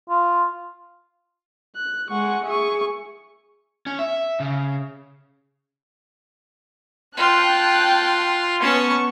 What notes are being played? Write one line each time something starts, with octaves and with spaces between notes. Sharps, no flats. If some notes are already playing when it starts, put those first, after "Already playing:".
F4
F#6
G#3 F#5 C#6
G#4 E5 C#6
C#4
E5
C#3
F4 G5 A5 F#6
B3 C#4 A5 C#6